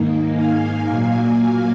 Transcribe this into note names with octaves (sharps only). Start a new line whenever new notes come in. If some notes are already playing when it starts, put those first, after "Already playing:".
Already playing: G#2 D#3 A#3 D#4
F5 G#5
A#2 F#3 A#3 F5 G#5